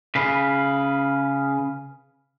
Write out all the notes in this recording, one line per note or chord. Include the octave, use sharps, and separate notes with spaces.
C#3 B4